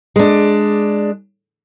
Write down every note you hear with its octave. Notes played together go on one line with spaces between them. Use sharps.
G#3 D4